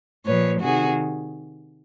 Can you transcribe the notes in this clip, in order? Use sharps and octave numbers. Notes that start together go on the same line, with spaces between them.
A#2 F3 B4 C#5
C3 D#3 F#4 G#4